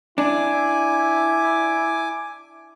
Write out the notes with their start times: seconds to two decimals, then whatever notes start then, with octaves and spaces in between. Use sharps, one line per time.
0.18 D4 E4 G#5 D6